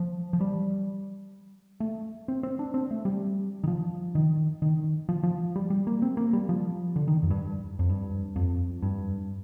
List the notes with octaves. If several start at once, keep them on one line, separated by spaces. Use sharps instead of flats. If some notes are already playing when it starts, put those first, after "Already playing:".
Already playing: F3
F3
G3
A3
C4
C4
D4
C4
A3
G3
D#3
F3
D#3
D#3
F3
F3
G3
G3
A#3
C4
A#3
G3
F3
D3
D#3
F2
G2
F2
G2
F2
G2